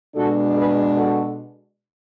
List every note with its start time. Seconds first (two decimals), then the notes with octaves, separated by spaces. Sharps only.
0.15 B2 G#3 D4 F#4 A4
0.55 G#4 B4
0.95 F#4 A4